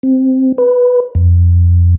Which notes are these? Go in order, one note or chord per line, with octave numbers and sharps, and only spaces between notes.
C4
B4
F2